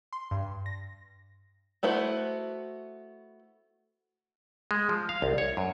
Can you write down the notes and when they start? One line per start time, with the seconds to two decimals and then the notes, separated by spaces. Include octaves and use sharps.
0.13 C6
0.31 G2
0.66 A#6
1.83 A3 B3 E4 F#4 C5
4.71 G#3
4.89 F3
5.09 F5
5.22 C2
5.38 C#5
5.57 F#2